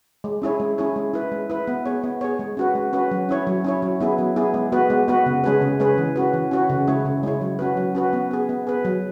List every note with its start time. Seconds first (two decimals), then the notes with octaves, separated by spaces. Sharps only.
0.24 G#3
0.42 C#4 E4 G#4 C#5
0.60 G#3
0.78 C#4 E4 G#4 C#5
0.96 G#3
1.14 E4 B4
1.32 G#3
1.50 E4 B4
1.68 B3
1.86 G#4 C#5
2.04 B3
2.21 G#4 C#5
2.39 G#3
2.57 C#4 F#4 B4
2.75 G#3
2.93 C#4 F#4 B4
3.11 F#3
3.29 C#4 E4 C#5
3.47 F#3
3.64 C#4 E4 C#5
3.82 F#3
4.01 B3 E4 G#4
4.18 F#3
4.36 B3 E4 G#4
4.54 G#3
4.72 B3 F#4 B4
4.90 G#3
5.08 B3 F#4 B4
5.26 C#3
5.44 G#3 C#4 G#4 B4
5.62 C#3
5.80 G#3 C#4 G#4 B4
5.98 E3
6.16 C#4 F#4 B4
6.33 E3
6.51 C#4 F#4 B4
6.70 C#3
6.87 G#3 C#4 E4 C#5
7.05 C#3
7.23 G#3 C#4 E4 C#5
7.41 F#3
7.59 C#4 F#4 B4
7.77 F#3
7.95 C#4 F#4 B4
8.13 B3
8.31 G#4 B4
8.49 B3
8.67 G#4 B4
8.85 F#3